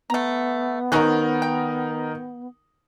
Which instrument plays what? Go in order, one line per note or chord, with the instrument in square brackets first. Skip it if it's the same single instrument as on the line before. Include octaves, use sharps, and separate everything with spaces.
[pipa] A3 A#5 [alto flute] B3
[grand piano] D#3 D#4 A#4 [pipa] C4 C#4 F#4
[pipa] G5